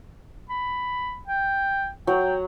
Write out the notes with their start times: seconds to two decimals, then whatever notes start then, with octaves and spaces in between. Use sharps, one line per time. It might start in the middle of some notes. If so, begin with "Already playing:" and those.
0.50 B5
1.27 G5
2.07 F#3 G5